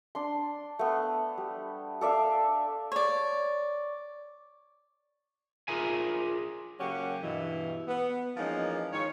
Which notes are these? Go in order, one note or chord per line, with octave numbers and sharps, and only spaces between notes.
D4 C6
A3 B3
G3
A4 D5 E5 F5
C#5 D5
F4 G#4 A#4 E5 G#5
C#3 F#3 A#3 C#4 G4 F#5
G2 B2 E3
B3
E3 F3 G#3 A#3 C#4 D#4
G#2 D#3 F4 C#5